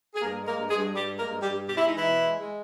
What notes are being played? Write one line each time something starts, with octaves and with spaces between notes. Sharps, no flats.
G#4
G2 A#3 A#4
G#3
A#3 A#4
G2
G#3 G#4
G2
G2 G3 G4
G#3
A#3 A#4
G2
G3 G4
G2
B2 G4
E4
G#3 D#4
E3 E4
B2
G#3
G#3